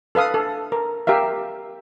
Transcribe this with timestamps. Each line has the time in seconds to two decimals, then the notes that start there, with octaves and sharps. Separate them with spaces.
0.15 A4 B4 F5 D#6
0.34 A4
0.72 A#4
1.07 G4 A#4 E5 F5